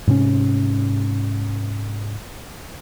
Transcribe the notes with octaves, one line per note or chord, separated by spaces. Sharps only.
G#2 C3 C4 C#4